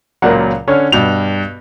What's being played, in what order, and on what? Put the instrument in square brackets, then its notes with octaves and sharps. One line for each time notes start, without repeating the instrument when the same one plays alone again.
[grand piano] C#2 A#2 F#3 [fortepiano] A#4 D5 F#5
[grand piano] D3 C#4 [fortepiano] C#5 F6
[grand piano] G2 F7 [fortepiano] B2